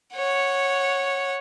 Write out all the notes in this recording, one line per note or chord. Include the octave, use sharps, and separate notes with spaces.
C#5 F#5